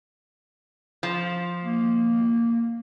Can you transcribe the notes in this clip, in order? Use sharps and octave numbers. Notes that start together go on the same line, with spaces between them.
F3
A#3